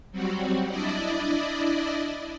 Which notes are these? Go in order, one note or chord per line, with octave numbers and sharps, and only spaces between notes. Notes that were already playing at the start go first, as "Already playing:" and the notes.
F#3 G3 C4 F#4
D4 E4 D5 D#5